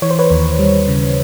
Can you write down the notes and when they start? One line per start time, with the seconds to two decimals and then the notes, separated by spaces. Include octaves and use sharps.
0.02 E3 C#5
0.11 C5
0.19 B4 C#5
0.30 D#2
0.59 G3
0.88 C#3